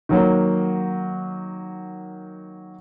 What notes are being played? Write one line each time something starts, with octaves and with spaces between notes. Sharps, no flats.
D#3 F#3 A#3